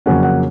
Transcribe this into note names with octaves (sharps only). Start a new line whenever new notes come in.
F2 C#3 F#3 A#3 C#4 F#5
F#5